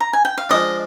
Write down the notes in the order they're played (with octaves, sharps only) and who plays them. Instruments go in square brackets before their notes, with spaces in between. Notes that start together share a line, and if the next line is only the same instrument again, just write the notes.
[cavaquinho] A#5
G#5
G5
F5
[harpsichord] F3 G#3 D4 [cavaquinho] D#5